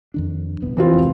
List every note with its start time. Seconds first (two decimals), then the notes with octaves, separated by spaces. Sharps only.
0.14 F2 D#3 D4
0.62 D#1 C2 B3
0.77 E3 C4 F4
0.94 F1 C#2